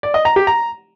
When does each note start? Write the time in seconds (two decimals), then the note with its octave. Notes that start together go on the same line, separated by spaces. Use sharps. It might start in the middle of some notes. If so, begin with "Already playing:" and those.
0.03 D5
0.14 D#5
0.25 A#5
0.36 G4
0.47 A#5